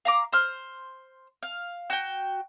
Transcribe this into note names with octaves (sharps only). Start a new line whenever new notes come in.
F5 A#5 D6
C5 F6
F5
F#4 G5